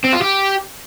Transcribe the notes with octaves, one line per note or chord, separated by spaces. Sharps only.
C4
F4
G4